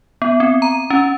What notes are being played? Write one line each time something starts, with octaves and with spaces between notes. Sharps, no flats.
B3
C4
A#5
C#4